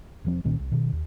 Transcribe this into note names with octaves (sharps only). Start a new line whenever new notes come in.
E1 F3 C4
C2 A#2 D#3 C#4
C2
B2 D#3
D#2